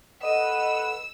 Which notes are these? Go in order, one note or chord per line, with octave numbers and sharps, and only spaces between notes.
A4 B4 D#5 F#5 E6 D#7